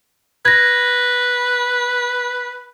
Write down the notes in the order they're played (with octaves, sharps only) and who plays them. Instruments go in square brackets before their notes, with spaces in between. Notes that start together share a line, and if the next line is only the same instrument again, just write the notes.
[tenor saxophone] B4 [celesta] G#6 A#6